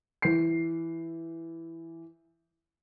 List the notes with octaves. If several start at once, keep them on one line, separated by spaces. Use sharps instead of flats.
E3 C7